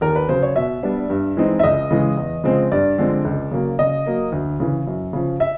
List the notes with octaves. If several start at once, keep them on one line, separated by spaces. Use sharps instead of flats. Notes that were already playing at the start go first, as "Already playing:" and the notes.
D#2 A#4
B4
C#3 F#3 C5
C#5
B2 E5
G3 B3 D4
G2
E3 G#3 C4 D#4
E5
C#2 D#5
C#3 E3 G#3
E2
C#3 F3 G#3 C4
G2 D5
D3 F3 G#3 C4
C#2
C#3 F#3 A#3
C#3 D#5
F#3 A#3
D2
C#3 E3
F#2
C#3 F3
E5